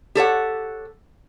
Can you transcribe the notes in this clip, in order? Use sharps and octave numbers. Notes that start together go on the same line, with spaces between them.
G4 A4 C#5 F#5